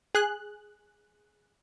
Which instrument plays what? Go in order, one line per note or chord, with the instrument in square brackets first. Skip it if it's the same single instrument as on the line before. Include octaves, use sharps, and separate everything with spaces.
[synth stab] G#4 F#6